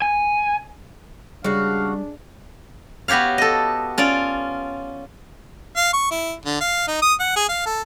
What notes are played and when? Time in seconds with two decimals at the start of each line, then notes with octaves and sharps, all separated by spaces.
0.02 G#5
1.44 C#3 G3 G#3 D4 F#4 F5
3.08 B3 F#4 G4 C#5 F5
3.38 A4 D#5
3.98 C#4 F4 D5
5.76 F5
5.93 C#6
6.11 E4
6.45 D3
6.61 F5
6.88 D#4
7.02 D#6
7.20 F#5
7.36 G#4
7.49 F5
7.66 A4